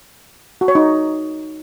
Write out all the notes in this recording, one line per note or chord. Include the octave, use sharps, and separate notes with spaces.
F#4
C#5
D#4